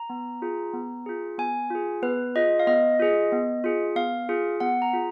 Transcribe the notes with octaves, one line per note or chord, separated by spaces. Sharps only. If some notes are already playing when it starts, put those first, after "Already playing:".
Already playing: A#5
B3
F4 G#4
B3
F4 G#4
B3 G#5
F4 G#4
B3 B4
F4 G#4 D#5
F5
B3 D#5
F4 G#4
B3
F4 G#4
B3 F5
F4 G#4
B3 F#5
A#5
F4 G#4